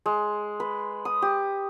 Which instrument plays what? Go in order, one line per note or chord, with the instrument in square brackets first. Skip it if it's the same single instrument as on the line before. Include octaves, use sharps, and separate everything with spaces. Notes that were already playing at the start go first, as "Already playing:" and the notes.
[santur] G#3
B4
D#6
G4